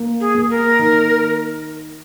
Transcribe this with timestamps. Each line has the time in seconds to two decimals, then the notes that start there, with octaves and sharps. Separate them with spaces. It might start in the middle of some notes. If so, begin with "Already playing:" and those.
Already playing: A#3
0.20 G#4
0.35 A#3
0.49 A#4
0.79 D#3